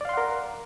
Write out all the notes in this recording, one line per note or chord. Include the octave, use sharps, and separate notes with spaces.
A#4 D5 F5 F#5 C6